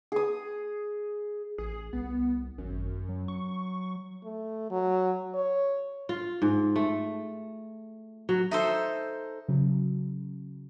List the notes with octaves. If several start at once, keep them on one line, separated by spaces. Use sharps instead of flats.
G#4 D#6
A1 G#4
C2 B3
G#1 F#2
F#3
C#6
A3
F#3
C#5
F4
G#2
A3
F#3
D#4 A4 C5 E5 E6
C#3 F#3